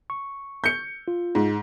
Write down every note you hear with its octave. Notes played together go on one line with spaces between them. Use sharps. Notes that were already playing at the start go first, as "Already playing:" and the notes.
C#6
G6 C#7
F4
G#2